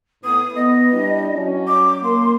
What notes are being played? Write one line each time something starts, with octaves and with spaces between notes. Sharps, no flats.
A2 B3 D#6
B3 D#5
G3 D4 E4
F#3 C#4
D6
A#3 C6